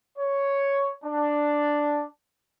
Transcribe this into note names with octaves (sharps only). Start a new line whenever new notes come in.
C#5
D4